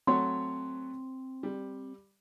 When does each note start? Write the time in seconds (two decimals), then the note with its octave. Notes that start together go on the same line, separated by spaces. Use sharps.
0.07 F#3 A3 C4 C#5 C6
1.43 G3